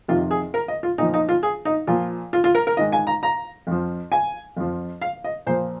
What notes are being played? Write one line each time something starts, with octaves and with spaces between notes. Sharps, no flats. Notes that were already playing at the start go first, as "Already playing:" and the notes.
F2 C3 D#3 F4
G#4
A#4
D#5
F4
A#2 F3 D#4
D#4
F4
G#4
D#4
A#2 F3 F4
F4
F4
A#4
A#4
G#2 D#3 D#5
G#5
A#5
A#5
F2 F3
G#5
F2 F3
F5
D#5
A#2 F3 C5